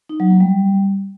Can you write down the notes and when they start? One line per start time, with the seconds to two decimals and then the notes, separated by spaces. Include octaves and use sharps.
0.09 D#4
0.20 F#3
0.30 A#3
0.40 G3